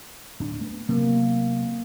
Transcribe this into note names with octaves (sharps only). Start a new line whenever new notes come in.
D1 D4
A3 B3
C3 F#3 A#3 B3